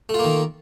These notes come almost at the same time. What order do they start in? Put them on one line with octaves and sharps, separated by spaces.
A3 F4 A#3 D#3